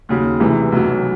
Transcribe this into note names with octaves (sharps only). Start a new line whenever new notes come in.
D#2 C#3 F#3
D2 C3 E3 G#3
B1 B2 F#3